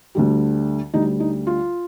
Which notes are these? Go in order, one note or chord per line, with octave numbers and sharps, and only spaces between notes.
D2 D3 G3
D2 D3 G3 D#4
D#4
F4